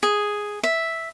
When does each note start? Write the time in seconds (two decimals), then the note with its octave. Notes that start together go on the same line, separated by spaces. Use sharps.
0.03 G#4
0.63 E5